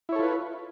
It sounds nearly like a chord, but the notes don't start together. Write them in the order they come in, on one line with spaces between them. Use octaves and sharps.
E4 C#5 A4 F4 B4